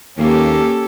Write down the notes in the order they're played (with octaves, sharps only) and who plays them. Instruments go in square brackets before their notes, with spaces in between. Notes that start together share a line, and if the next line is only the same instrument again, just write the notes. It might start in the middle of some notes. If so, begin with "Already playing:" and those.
[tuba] D#2 [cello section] A#3 [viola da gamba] C#4 G4 A4